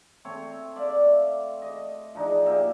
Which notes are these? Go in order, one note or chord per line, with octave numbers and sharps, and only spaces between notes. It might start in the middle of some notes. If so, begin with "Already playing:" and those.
A3 C4 C#5
C5 D5 E5 F5
D#5
F3 D4 D#4 G#4
A#2 G4 E5